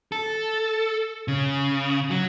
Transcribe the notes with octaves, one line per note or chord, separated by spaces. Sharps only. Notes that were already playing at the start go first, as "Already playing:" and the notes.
A4
C#3
F#3